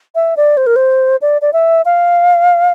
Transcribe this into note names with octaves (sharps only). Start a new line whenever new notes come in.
E5
D5
C5
A#4
C5
D5
D5
E5
F5